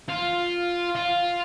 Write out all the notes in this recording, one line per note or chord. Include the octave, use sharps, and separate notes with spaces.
F4
F4